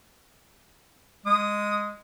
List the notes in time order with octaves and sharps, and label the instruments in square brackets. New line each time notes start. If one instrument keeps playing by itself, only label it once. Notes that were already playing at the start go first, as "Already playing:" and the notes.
[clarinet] G#3 [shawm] D#6